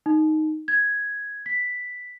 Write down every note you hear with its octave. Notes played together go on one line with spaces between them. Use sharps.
D#4
G#6
B6